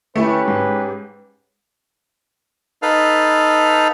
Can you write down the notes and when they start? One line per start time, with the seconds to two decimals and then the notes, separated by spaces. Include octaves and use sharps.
0.16 A3 C#4 E4 G4 B4
0.48 G#2
2.82 D#4 A4 B4 F5